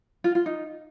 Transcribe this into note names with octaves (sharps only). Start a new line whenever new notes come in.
F4
F4
D#4